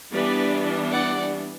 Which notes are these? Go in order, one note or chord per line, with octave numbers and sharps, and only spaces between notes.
E3 G3 B3 D4 B4 D5
D5 F#5